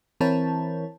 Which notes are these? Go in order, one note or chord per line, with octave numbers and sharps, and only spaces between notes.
E3 C4 E4 A#4 C#5 A5